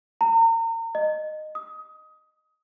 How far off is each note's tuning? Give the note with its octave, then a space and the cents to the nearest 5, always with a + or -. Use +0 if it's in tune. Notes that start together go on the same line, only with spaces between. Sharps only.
A#5 -35
D#5 -15
D#6 +20